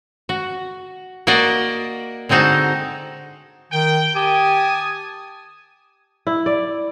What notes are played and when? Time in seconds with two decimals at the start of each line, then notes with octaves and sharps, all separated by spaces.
0.29 F#4
1.27 A#3 F#4 A#4 D5 D#5
2.29 D3 G#3 C4 D#4 F#4 A5
3.72 D#3 G5
4.15 G4 G#5 A5 D#6
6.27 E4
6.46 D5